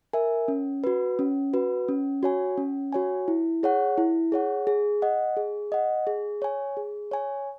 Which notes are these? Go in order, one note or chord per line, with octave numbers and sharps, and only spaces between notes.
A#4 E5 G#5
C#4
F#4 B4
C#4
F#4 B4
C#4
F#4 C#5 G#5
C#4
F#4 C#5 G#5
E4
G#4 C#5 F#5
E4
G#4 C#5 F#5
G#4
D#5 F#5
G#4
D#5 F#5
G#4
C#5 G#5
G#4
C#5 G#5